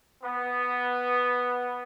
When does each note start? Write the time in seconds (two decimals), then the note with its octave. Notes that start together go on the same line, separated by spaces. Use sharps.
0.23 B3